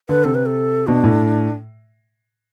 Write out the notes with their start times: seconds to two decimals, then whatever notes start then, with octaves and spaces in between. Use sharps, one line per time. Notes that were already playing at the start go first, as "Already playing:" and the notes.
0.09 D3 B4
0.24 C3 A4
0.35 B4
0.46 A4
0.87 B2 D4
1.04 A2